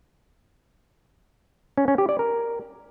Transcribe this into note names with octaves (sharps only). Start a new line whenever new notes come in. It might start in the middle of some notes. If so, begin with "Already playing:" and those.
C#4
C#4
G4
D5
A#4